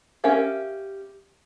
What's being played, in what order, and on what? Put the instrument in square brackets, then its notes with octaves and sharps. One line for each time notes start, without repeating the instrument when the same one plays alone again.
[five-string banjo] C#4 G4 A#4 E5 F5